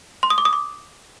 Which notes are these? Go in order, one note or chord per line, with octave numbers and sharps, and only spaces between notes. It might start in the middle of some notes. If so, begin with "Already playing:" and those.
C6
D#6
D6
D#6
D6